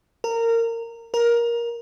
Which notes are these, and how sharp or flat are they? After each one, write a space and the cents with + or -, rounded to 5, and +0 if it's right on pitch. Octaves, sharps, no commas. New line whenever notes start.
A#4 -20
A#4 +15